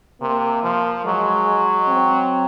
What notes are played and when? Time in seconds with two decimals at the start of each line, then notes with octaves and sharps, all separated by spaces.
0.21 C3 A#3
0.63 F3
1.05 F#3 G#3
1.88 C4